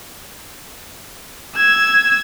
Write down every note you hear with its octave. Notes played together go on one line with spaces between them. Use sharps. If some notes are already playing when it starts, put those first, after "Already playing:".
E6 G#6